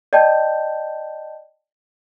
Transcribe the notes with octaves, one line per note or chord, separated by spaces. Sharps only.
D5 D#5 G5 A5 G6